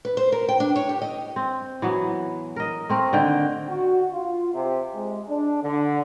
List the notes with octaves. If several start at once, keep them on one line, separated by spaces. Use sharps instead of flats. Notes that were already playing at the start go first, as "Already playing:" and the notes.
B4
C5
A#4
G5
D4
C#5
G4
D#5
C4
E3 F#3 B3
A#4 D#5
A3 C4 A#4
D3 D#3 G5
F#4
F4
C3
G#3
D4
D3